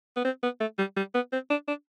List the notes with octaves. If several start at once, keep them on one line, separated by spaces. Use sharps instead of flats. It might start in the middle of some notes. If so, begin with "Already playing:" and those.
B3
C4
B3
A3
G3
G3
B3
C4
D4
D4